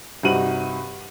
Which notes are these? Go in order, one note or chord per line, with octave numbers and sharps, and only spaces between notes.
G2 C3 D#4 F#4 D#7 F#7